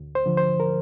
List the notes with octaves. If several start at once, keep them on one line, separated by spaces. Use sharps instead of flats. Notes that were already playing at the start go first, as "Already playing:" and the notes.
Already playing: D2
C5
D3 F3
C5
A#4